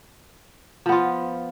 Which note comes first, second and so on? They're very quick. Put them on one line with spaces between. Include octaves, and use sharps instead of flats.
F3 B3 F4